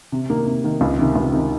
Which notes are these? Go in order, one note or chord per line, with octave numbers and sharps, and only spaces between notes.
C3
D#3 A#3
C3
D#3 A#3
C#2
C3 D#3
C#2
C3 D#3